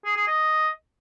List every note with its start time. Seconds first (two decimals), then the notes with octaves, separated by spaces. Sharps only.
0.05 G#4
0.16 G#4
0.27 D#5